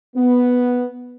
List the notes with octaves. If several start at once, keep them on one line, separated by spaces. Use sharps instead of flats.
B3